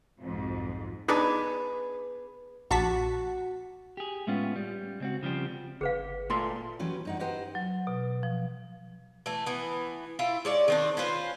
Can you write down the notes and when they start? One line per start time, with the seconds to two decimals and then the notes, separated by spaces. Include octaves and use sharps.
0.19 B1 F2 G#2
1.08 B3 D4 D#4 G#4 B4 D5
2.71 A#1 F#4 A5 B6
3.97 G4 G#4
4.27 A2 G#3 B3 C#4 F4
4.56 G3
5.00 C#2 C4 F#4
5.23 C#3 F3 G3 C4
5.81 G1 G#4 B4 F5
6.30 A#2 A3 C6
6.79 E3 F#3 C#4 G4 B4
7.05 G2 D#4 F#5
7.20 D#4 G4 B4 C5 D#5 F#5
7.55 F#3
7.87 B2
8.23 F3
9.26 E3 A3
9.46 E3 B3
10.19 E4 F4 E5
10.45 G#3 C#5 D5
10.68 D#3 C4 D4
10.97 C#4 F4 B4 C5